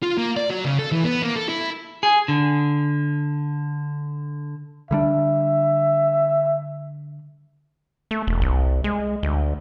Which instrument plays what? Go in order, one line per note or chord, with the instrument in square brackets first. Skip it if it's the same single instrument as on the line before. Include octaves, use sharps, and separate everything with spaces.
[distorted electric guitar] F4
A#3
D5
F#3
C#3
A4
E3
B3
A#3
A4
E4
[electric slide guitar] G#4
D3
[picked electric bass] D3 G3 D4 [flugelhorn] E5
[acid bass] A3
E1
C2
G#3
D2